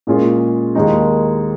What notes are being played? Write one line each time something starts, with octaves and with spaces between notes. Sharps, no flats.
A#2 G#3 C#4 F4 G#4
D#2 D#3 G#3 D#4